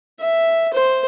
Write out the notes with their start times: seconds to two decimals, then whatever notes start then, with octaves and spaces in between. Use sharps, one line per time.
0.20 E5
0.74 C5